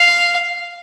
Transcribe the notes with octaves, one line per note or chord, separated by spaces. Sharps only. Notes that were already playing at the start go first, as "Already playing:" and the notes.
Already playing: F5